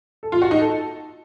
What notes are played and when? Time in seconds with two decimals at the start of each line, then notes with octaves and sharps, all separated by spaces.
0.23 A4
0.32 F4
0.42 F#4
0.51 D#4
0.60 A4